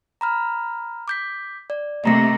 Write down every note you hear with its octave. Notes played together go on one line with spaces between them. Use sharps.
A#5 B5 F6
D6 G6 B6
D5
C3 A3 A#3 D#5 A#5 A#6